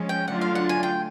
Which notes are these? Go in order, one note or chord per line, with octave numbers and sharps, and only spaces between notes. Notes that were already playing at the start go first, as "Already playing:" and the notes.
Already playing: F3 G#3 C#4
G5
D3 F#3 A3 D4 F4 F#5
F5
F#5
G#5
G5